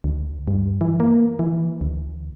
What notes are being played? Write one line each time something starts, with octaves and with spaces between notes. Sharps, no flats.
D2
G2
E3
A#3
E3
D2